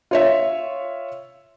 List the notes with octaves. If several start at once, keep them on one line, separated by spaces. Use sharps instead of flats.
F4 C#5 E5